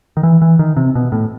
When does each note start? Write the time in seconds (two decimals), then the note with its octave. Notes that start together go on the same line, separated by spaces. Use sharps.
0.17 D#3
0.23 E3
0.42 E3
0.59 D#3
0.77 C3
0.95 B2
1.12 A2